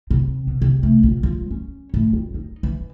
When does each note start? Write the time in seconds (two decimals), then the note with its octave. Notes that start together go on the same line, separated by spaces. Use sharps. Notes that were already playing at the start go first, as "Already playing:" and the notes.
0.11 C3
0.47 B2
0.62 C3
0.83 A3
1.03 A#1
1.23 F3
1.51 C#4
1.94 A2
2.13 F2
2.34 D#4
2.63 E3